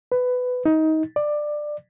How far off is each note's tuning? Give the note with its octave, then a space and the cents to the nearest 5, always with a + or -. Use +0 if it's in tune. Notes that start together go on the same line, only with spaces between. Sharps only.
B4 +15
D#4 +20
D5 +20